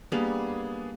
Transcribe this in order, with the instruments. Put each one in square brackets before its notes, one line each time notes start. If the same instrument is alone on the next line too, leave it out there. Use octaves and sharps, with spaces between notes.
[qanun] G3 A#3 [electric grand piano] B3 D4 G#4